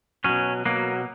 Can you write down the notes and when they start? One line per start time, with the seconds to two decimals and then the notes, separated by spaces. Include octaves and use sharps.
0.24 B2 F#3 C#4
0.65 B2 F#3 A#3